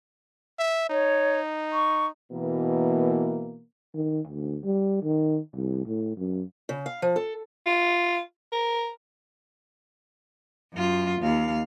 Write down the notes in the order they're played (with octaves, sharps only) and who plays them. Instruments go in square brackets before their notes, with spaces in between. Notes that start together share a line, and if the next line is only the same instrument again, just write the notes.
[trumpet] E5
[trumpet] D#4 [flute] C#5
[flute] C#6
[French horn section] B2 E3 A#3
[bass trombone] D#3
D2
G3
D#3
C2
A2
F#2
[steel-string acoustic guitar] C#3
F5
F3
A4
[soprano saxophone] F4
A#4
[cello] F#2 F4
D#2 F5